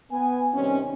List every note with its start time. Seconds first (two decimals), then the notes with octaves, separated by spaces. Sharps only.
0.11 B3 G#5
0.54 C3 D#3 G3 C4 C#4